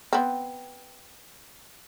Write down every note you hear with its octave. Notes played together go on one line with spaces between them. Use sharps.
B3 C4